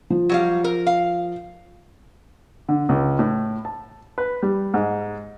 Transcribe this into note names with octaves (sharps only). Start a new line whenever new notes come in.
F3
F#3 G3 F5
A#4
F5
D3
C#2
A2
A5
B4
G3
G#2